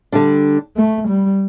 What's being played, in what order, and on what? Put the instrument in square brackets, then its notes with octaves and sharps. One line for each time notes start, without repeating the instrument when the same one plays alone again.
[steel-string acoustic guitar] D3 G3 D4
[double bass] A3
G3